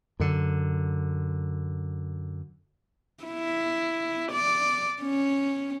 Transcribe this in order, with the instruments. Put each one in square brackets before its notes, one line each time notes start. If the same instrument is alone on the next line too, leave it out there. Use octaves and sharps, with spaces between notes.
[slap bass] F#2 D3
[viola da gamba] E4
D5
C#4